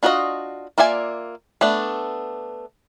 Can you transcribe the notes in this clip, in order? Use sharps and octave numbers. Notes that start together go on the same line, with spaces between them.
D4 F4 F#4 B4 D#5
A#3 F4 D5 E5 G#5
A3 B3 D4